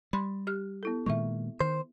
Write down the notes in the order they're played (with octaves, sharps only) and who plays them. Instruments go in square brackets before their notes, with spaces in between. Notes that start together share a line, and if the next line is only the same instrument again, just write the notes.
[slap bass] G3 [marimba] B5 C6
[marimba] G4 F6
B3 E4 A4
[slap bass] A#2 D#3 G#3 [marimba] E5 C#6
[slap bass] D#3 [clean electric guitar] C5